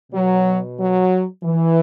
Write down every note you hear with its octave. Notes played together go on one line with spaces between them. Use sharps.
B2 F#3
F#3
E3